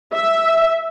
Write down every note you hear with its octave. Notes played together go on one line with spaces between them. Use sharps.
E5